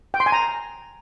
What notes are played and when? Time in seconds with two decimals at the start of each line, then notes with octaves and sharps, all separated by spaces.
0.14 G5
0.20 C6
0.26 G#5
0.32 A#5